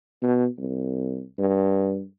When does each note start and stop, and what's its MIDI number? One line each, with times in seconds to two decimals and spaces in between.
0.22 0.47 47
0.59 1.23 36
1.39 2.03 43